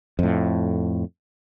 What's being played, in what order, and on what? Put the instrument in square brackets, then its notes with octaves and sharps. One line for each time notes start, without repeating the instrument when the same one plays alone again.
[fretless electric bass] F2 A2